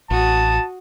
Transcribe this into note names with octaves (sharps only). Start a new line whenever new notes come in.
A1 F#4 A5 D#6